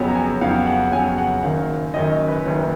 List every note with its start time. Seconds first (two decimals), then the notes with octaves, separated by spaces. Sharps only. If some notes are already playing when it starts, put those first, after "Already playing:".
Already playing: F2 C#3 F#3 B3
0.08 A#5
0.15 G#5
0.41 F2 C#3 F#3 B3 F5
0.67 F#5
0.92 F2 C#3 F#3 B3 G#5
1.18 F#5
1.43 F#1 F#2 D#3 F5
1.94 F#1 F#2 D#3 D#5
2.28 B4
2.45 F#1 F#2 D#3